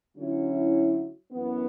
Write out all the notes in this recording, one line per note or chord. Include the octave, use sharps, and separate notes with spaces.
D3 F#3 C#4 E4
F#2 E3 B3